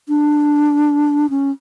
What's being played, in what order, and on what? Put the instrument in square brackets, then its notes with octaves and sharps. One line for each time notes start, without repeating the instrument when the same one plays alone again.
[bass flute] D4
C#4